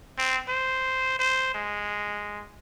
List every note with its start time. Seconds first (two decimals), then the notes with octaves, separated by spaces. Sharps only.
0.18 C4
0.48 C5
1.19 C5
1.54 G#3